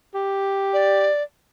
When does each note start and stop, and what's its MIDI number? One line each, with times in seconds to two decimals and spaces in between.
0.15 1.09 67
0.73 1.23 74